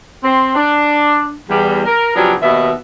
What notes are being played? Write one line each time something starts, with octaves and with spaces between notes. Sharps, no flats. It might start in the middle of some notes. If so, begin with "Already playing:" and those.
C4
D4
E2 G3
A#4
C#3 F3 F#3 B3 D4 G4
D#2 B2 E5